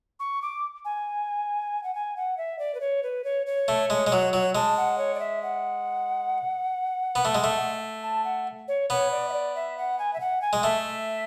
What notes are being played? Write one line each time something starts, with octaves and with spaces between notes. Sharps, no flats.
C#6
D6
G#5
F#5
G#5
F#5
E5
D5
B4
C#5
B4
C#5
C#5
A3
G#3
G#3
F#3
F#3
G#3 A5
F#5
C#5
D5
E5
F#5
B3
A3
G#3
A3
A5
F#5
C#5
B3 C#5
D5
E5
D5
E5
F#5
G#5
E5
F#5
G#5
G#3
A3 E5